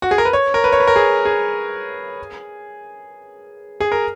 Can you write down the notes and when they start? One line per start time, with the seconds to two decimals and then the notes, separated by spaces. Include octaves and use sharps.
0.02 F#4
0.11 G#4
0.18 A#4
0.25 B4
0.33 C#5
0.54 A#4
0.64 B4
0.72 C#5
0.80 B4
0.87 A#4
0.96 G#4
1.25 G#4
3.80 G#4
3.92 A#4